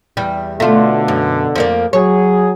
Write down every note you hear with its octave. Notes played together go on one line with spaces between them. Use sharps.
E2 G3
B2 D3 A3 F4
F#2
F2 A#3 D5
F#3 G#4 C#5